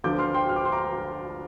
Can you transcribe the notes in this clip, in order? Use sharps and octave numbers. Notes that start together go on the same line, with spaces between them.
D2 D3 F3 D6 G6
C6 F6
G5 C6
F6
D6
C6
A#5 D6